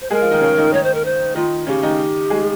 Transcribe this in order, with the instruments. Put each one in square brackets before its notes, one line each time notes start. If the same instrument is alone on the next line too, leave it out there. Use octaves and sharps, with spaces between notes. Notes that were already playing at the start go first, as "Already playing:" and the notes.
[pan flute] C5
[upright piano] G#3 G#4 [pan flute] A#4
[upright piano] F3 F4
D#3 D#4
C#3 C#4
D#3 D#4
[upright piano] D#3 D#4 [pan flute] C#5
[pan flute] C5
A#4
C5
[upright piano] D#3 D#4 [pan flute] F4
[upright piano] C#3 C#4 [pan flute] G4
[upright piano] D#3 D#4
G#3 G#4